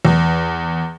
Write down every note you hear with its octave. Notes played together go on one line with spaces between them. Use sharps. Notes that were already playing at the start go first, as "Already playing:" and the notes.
E2